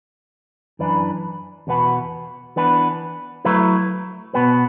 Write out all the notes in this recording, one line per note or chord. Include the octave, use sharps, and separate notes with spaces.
F#2 E3 D4 B4
E2 B2 B3 F#4 B4
E3 B3 D4 B4
F#3 A3 E4 B4
B2 B3 F#4 B4